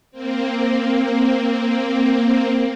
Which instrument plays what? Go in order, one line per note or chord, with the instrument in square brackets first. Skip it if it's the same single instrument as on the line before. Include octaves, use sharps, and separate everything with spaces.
[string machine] A#3 C4